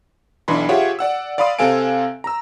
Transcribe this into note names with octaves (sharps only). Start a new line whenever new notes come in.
B1 E3 D4 B5 C6
F4 G4 G#4 C#5 E5 F#5
D5 F#5 E6
D5 F5 B5 C6 D#6
C3 C4 A4 F5 G#5 D7
A#5 E6